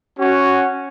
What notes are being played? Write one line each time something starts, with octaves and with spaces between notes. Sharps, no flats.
C#4 F#4